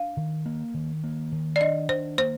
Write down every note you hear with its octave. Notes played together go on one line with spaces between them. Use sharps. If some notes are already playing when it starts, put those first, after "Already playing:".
Already playing: D4 F5
D#3
A#3
D#3
A#3
D#3
D5
D4 D#5
D#3 C5
A#3 C5